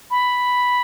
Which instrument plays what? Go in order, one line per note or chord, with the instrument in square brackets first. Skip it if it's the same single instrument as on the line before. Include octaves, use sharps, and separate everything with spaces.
[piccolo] B5